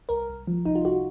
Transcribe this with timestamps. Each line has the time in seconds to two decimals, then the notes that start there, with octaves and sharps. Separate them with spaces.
0.09 C2 A#4
0.29 C2
0.47 F3
0.65 C2 D#4
0.75 F4
0.85 C2 F#4